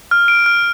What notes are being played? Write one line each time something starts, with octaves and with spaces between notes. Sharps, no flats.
F6
D7
F6